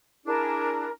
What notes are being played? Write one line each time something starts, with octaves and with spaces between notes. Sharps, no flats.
D4 E4 G#4 A#4